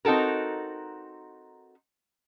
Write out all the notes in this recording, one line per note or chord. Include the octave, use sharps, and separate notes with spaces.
C4 D#4 F#4 A4 A#4